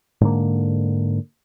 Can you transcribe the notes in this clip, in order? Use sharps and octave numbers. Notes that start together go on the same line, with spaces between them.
G#2 D3 A#3